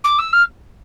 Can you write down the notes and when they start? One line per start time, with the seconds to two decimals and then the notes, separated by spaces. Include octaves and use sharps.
0.04 D6
0.19 E6
0.33 F6